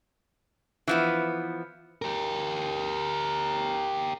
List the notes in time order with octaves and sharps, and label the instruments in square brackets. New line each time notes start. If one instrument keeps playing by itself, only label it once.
[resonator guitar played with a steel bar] E3 F3 B3
[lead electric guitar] G4 A#4